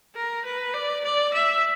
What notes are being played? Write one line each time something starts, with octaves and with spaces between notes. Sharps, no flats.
A#4
B4
D5
D5
E5